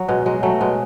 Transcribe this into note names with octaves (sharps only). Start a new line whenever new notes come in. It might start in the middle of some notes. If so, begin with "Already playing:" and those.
Already playing: F#3
B2 G#3
F#3 G#3
F#3 A3
B2 G#3